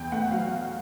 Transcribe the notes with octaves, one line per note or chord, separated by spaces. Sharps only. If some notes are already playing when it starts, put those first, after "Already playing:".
Already playing: E2 G5
A3 F#5
F#3 F5